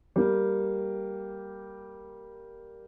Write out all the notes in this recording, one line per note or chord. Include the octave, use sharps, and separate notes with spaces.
G3 A#3